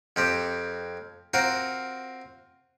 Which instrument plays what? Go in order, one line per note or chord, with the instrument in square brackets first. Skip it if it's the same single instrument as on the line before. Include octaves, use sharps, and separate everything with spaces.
[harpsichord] F2 C4 G4
C4 F4 F#4 A#4